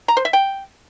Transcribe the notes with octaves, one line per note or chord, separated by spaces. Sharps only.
A#5
C5
E5
G5